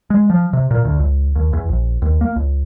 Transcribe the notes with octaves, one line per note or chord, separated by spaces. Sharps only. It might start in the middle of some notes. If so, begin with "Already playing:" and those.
G#3
F3
C3
A#2
D2
C#2
D#2
E2
A#1
D#2
A#3
C#2